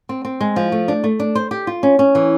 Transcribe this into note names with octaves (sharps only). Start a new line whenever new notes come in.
C4
C4
G#3
F3
A3
D4
A3
D4
C5
G4
F4
C#4
C#4
E3